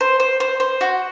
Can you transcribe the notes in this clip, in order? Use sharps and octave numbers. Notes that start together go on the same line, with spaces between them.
C5
C5
C5
C5
F#4